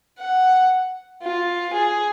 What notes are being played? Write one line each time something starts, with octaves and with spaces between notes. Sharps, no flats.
F#5
F4
G#4